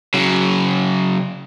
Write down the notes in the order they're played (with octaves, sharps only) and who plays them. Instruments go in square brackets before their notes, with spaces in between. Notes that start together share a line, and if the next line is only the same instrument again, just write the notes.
[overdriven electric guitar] C#3 F#3